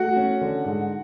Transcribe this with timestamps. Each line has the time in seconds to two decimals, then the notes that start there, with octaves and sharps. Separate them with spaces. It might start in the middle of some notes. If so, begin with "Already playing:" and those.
Already playing: A3 F#4 F#5
0.16 C#4
0.41 D3
0.65 G#2